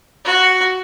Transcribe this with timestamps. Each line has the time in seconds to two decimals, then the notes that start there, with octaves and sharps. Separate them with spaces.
0.25 F#4